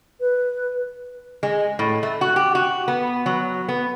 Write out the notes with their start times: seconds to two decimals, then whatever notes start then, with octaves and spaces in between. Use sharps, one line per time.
0.20 B4
1.43 G#3
1.79 A2
2.03 A3
2.21 F#4
2.36 G4
2.55 F#4
2.88 B3
3.26 F#3
3.69 B3